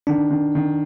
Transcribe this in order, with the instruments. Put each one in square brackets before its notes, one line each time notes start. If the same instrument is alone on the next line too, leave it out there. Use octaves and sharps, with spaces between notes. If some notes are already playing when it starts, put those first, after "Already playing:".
[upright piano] D#3 [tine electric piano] D4
[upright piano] D#3
D#3